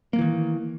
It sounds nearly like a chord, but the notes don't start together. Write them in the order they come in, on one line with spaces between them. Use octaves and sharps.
A#3 G#3 E3 D#3